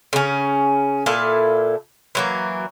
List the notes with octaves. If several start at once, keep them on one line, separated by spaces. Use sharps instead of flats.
C#3 C#4
A#2 E4 A4 F5
E3 F#3 A#3